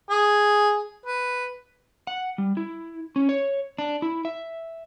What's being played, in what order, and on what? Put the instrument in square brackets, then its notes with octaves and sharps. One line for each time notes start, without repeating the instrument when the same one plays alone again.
[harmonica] G#4
B4
[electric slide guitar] F#5
G3
E4
C#4
C#5
D4
E4
E5